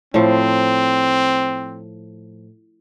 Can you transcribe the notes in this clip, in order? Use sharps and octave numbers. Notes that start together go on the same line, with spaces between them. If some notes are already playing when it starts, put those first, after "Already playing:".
A2 F3 C4